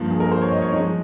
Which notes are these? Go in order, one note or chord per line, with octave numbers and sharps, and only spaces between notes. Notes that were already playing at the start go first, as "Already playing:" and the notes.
Already playing: G2 F3 A#3
G#4
A#4
C5
C#5
D#5
C#5
G#2 F3 G#3 D#5